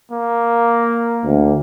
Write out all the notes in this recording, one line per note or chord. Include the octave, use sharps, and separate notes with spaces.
A#3
D2